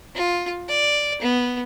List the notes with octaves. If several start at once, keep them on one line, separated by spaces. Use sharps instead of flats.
F4
D5
B3